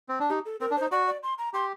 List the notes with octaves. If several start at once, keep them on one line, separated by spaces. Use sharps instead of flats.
C4
D4
D#4 G4
A4
C4 A#4
D4
D#4 C5
F#4 D5
D5
C6
A#5
G4 C6